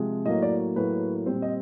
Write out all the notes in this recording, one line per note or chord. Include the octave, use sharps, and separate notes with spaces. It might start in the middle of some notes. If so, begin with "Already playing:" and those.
Already playing: C3 F3 G#3
A2 F#3 A#3 D#5
D5
A2 F#3 A#3 B4
A#2 G3 C4 C5
D#5